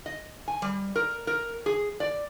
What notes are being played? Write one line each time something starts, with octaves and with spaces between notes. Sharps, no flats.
D#5
G#5
G3
A#4
A#4
G#4
D5